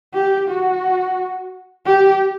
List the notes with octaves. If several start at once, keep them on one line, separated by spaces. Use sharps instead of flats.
G4
F#4
G4